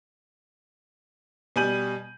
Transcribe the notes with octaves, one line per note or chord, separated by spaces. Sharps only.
B2 G3 G#5 G6 D#7 F#7